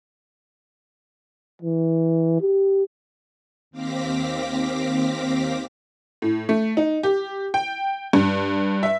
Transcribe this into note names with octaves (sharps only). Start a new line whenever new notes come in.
E3
G4
D#2 C4 F5 D6 A#6 B6
A2
A3
D#4
G4
G5
G2
E5